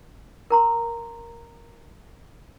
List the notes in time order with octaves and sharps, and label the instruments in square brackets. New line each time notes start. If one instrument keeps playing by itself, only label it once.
[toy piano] A#4 A#5 C6